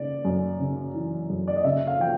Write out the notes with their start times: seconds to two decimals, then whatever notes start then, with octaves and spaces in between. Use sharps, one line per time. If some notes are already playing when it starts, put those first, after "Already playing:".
Already playing: C#3 D5
0.25 F#2
0.60 C#3
0.94 E3
1.30 F#2
1.48 D5
1.56 D#5
1.64 C#3 E5
1.87 F5
2.00 F3 G5